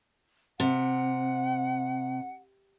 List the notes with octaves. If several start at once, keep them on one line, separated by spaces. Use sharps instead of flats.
C3 F#5